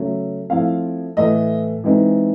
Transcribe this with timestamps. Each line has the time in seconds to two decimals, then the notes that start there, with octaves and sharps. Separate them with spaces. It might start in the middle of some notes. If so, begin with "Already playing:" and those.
Already playing: C#3 F#3 A3
0.50 F3 A3 C4 E4 F5
1.17 A2 E3 A3 D#5
1.84 E3 G#3 C4 D#4